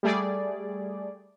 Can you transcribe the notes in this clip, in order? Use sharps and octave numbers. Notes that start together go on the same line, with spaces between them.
G3 A3 G#4 D5